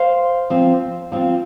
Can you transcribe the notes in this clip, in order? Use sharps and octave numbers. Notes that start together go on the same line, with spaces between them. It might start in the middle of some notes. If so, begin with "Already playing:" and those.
Already playing: C5 F5
F3 C4 F4
F3 C4 F4